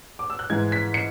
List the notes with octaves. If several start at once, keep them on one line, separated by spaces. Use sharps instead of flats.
D6
E6
F#6
G#2 E3 G#3 G#6
B6
C#7